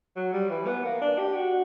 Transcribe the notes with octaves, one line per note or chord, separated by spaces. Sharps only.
F#3
G3
E3
B3
A#3
D4
G4
F#4